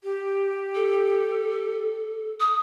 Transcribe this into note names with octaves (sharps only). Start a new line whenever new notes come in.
G4
A4
D#6